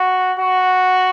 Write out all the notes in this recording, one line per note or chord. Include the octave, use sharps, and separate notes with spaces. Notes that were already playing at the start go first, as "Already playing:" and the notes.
Already playing: F#4
F#4